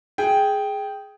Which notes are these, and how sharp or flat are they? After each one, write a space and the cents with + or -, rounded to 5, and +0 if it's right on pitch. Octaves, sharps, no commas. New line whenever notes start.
G#4 +5 G5 +0